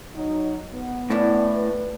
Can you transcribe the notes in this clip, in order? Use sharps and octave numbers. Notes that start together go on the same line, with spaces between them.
F#3 D#4
B3
A2 C#4 D4 E4
B4